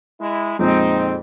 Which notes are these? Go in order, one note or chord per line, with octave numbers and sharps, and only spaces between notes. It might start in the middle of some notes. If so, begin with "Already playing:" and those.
G#3 E4
F2 A#2 G#3 C4 D#4